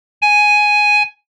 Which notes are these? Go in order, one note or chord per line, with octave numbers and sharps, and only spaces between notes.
G#5